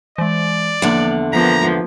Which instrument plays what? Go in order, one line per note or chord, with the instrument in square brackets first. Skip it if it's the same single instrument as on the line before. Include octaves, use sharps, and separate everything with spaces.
[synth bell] E3 G#3 [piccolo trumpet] D5
[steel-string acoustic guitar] E2 D3 [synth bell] F3 A#3 F#7
[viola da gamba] F3 A#3 B3 [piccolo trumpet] A#5 [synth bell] B6